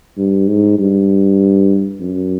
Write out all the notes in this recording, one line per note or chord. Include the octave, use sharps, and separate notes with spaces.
G2
G#2
G2
F#2